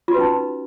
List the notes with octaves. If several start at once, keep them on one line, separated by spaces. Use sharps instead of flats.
C#4 D#4 F4 F#4 B4